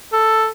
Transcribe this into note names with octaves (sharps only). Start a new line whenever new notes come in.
A4